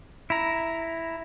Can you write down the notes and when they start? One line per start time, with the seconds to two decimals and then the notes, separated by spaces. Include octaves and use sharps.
0.30 E4 A#5